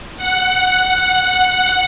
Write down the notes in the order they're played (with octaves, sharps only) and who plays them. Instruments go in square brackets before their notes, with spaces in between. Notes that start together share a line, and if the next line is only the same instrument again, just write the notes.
[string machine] F#5